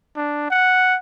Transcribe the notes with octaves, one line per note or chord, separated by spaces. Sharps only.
D4
F#5